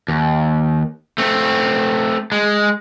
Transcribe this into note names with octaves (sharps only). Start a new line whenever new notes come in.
D#2
A3 C4
G#3